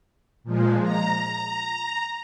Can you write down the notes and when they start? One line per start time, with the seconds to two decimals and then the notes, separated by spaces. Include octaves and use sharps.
0.44 A#2 F3 G#3
0.82 A#5